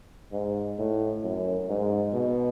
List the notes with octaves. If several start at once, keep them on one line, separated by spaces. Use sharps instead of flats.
G#2
A2
F#2
G#2
B2